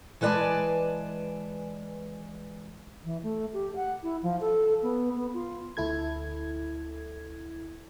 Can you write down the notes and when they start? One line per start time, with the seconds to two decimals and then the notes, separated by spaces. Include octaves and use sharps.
0.21 E3 G#3 B4 D5 G#5 A5
3.05 E3
3.23 A3
3.53 G4
3.76 F#5
4.03 E4
4.23 F3
4.41 A4
4.83 B3
5.16 B3
5.34 F4
5.77 D2 E4 A4 G#6